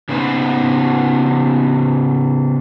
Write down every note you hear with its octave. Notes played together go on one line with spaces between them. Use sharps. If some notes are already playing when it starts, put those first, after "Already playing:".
C#3 B3 D#4 B4 C5